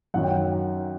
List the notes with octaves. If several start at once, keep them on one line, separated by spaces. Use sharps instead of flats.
F#2 D#3 F#3 F#5
G5
F#5